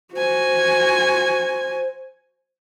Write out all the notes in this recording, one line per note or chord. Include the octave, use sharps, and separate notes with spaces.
F#4 C5 G#5